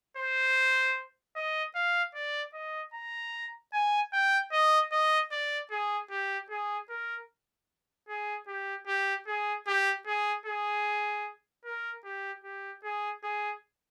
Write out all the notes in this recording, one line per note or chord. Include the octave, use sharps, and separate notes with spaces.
C5
D#5
F5
D5
D#5
A#5
G#5
G5
D#5
D#5
D5
G#4
G4
G#4
A#4
G#4
G4
G4
G#4
G4
G#4
G#4
A#4
G4
G4
G#4
G#4